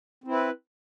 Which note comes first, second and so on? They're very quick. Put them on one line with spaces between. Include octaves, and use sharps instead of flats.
C4 E4 B4